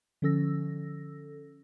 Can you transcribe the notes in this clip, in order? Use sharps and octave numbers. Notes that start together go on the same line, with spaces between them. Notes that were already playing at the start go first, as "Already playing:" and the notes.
D3 F3 C#4 A4 E6 A#6